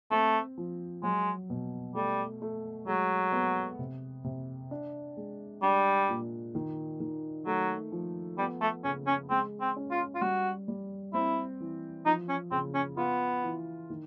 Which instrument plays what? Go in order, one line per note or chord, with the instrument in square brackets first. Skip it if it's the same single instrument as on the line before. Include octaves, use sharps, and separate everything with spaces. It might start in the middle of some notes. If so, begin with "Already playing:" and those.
[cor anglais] A3 [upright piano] C4
[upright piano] F3
[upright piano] F#3 [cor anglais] G#3
[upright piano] B2
[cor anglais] G3 [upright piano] A3
[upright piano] A3
[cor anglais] F#3 [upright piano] G#3
[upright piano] B3
C3
C3
D4
G#3
[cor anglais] G3 [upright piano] D4
[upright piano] A#2
D#3
D#3
[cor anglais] F#3 [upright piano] A3
[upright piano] F3
[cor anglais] G3 [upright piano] B3
[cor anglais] A3
[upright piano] C#3 [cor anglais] C#4
[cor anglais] C#4
[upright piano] G#3 [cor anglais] C4
[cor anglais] C4
[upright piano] C#4
[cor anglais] F4
F4
[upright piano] G3 [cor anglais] F#4
[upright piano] G3
[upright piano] C4 [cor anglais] E4
[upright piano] E3
[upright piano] F3 [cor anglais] D#4
[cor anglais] C#4
[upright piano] C#3 [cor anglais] C4
[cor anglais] C#4
[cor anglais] B3 [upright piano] F4
[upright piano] E3
D#3